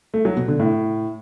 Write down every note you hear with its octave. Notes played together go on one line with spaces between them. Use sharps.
A3
F#3
B2
D3
A2